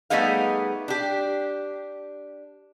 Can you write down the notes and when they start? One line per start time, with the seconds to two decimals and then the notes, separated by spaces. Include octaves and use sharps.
0.10 G3 A3 B3 D#4 G#4 F5
0.88 D4 G4